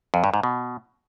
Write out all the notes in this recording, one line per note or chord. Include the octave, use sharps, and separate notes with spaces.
F2
G2
G#2
B2